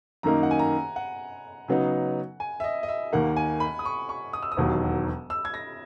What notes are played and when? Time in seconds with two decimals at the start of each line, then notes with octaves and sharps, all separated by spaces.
0.23 F#2 D#3 A#3 D#4 A#5
0.43 F#5
0.51 G#5
0.59 A#5
0.96 F#5
1.68 C#3 F#3 B3 D#4
2.40 G#5
2.60 E5
2.64 D#5
2.83 D#5
2.89 E5
3.13 D#2 D#3 A#3 F#5
3.36 G#5
3.60 B5
3.79 D#6
3.85 C#6
4.09 C#6
4.33 D#6
4.43 E6
4.52 D#6
4.57 E1 D#2 D#3 F#3
5.30 E6
5.45 G#6
5.54 A#6